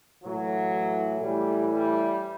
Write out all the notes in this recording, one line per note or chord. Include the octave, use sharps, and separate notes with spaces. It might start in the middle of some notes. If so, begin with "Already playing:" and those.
A2 E3 F#3
A2 E3 G3
G3